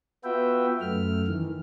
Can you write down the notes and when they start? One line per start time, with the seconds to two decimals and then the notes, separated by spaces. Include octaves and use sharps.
0.24 B3 F4 F#4 B4 E5 G5
0.81 F#2 A3 F6
1.28 D#3 E3